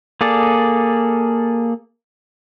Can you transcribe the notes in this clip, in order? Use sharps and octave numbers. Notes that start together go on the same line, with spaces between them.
A#3 G#4 A4 D5